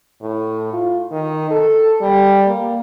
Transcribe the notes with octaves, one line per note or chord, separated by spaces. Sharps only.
A2
F4
D#3
A4
G3
A#3